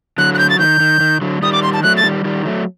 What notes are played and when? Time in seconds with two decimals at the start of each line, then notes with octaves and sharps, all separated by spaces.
0.18 D3 F#3 F#6
0.34 F#6
0.38 G6
0.50 A6
0.59 D#3 G6
0.80 D#3
1.00 D#3
1.21 D3 F#3
1.42 D#3 G3 D#6
1.52 D6
1.63 C6
1.73 A5
1.83 F#3 A3 F#6
1.97 A6
2.04 D#3 G3
2.25 D#3 G3
2.45 F#3 A3